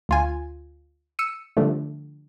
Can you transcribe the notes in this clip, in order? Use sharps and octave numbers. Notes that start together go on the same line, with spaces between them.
D2 F4 G#5
E6 C#7 D#7
D3 F3 G3 A3